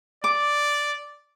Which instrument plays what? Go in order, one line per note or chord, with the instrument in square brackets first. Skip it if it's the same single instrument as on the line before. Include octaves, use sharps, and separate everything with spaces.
[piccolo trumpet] D5 [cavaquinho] D6